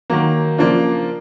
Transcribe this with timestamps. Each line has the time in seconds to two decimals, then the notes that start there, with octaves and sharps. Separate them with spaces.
0.10 D#3 F#3 A#3
0.58 C#3 F3 A#3 D4 F4